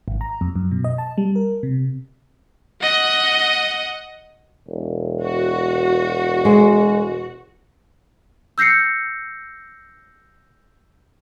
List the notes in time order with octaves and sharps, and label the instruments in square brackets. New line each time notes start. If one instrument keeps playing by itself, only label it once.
[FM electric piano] G#1
A#5
F2
F#2
B2
D#5
A5
G3
A#4
C3
[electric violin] D#5 F#5
[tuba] E1
[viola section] F#4
[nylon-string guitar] G#3
[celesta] E6 G6 A#6 C7 C#7